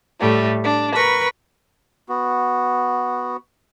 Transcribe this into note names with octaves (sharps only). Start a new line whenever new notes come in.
A2 G3 A3
D4
A#4 B4 B5 C#6
B3 F#4